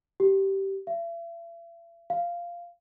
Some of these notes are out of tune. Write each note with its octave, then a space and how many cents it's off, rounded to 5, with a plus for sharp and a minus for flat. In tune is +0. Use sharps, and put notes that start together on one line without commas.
G4 -15
E5 +40
F5 -10